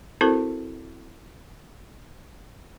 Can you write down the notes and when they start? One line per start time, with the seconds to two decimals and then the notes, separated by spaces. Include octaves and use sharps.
0.21 C4 E4 F#4 A4 A#4 C5